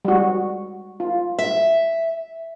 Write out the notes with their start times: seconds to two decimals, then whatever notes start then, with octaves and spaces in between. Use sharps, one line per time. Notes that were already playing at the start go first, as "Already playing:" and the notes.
0.05 G3 G#3 F#4
1.00 F4
1.39 E5